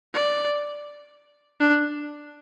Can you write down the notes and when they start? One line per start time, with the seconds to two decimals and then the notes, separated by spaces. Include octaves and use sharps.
0.14 D5
1.60 D4